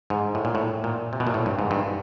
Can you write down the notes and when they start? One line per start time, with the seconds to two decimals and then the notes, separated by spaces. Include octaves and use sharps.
0.10 G#2
0.35 A2
0.45 A#2
0.55 A2
0.84 A#2
1.13 C3
1.20 B2
1.27 A#2
1.34 A2
1.46 G2
1.59 G#2
1.71 G2